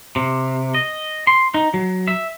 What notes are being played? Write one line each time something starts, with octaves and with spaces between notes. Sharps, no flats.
C3
D#5
C6
D#4
F#3
E5